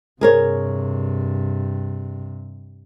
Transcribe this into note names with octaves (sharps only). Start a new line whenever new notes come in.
G2 C3 G#4 A#4 C#5